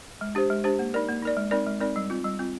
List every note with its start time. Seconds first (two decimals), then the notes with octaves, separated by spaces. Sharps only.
0.21 G#3
0.35 D4 G4 C5
0.50 G#3
0.64 D4 G4 C5
0.79 A#3
0.94 D#4 A#4 D5
1.09 A#3
1.22 D#4 A#4 D5
1.37 G#3
1.51 C4 D#4 A#4 D5
1.67 G#3
1.80 C4 D#4 A#4 D5
1.96 G3
2.10 C4 F4
2.24 G3
2.39 C4 F4